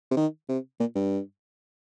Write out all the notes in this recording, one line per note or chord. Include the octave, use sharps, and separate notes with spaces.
C3
D#3
C3
A#2
G2